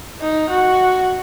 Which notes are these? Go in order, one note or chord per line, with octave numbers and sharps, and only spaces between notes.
D#4
F#4